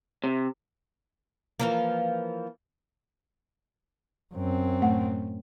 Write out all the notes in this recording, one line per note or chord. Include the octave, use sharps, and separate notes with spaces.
C3
E3 F3 A#3
F#2 C4
A2 A3 F#5